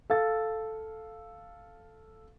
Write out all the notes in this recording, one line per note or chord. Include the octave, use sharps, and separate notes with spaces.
A4 F5 A6